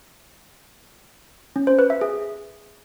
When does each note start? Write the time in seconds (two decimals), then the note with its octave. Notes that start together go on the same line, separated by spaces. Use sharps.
1.56 C#4
1.67 C5
1.79 B4
1.90 E5
2.01 G#4